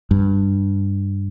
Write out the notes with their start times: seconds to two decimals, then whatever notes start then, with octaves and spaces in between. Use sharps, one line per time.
0.11 G2